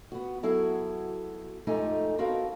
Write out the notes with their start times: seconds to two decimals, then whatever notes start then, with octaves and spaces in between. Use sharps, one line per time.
0.12 B3 F#4
0.43 F#3 B3 E4 F#4 G#4 A4
1.67 F2 G#2 A3 D#4 G4 G#5
2.18 B3 C4 F#4 A4 A#4 F5